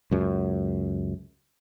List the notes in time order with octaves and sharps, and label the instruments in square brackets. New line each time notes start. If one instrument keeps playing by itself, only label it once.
[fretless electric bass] C#2 F#2